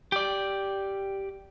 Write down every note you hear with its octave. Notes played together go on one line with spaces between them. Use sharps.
G4 D5